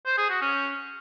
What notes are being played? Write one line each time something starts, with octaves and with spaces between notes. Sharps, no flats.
C5
G#4
F#4
C#4